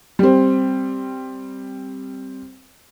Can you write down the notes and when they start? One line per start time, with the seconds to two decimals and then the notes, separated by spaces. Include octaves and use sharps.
0.19 G3 C4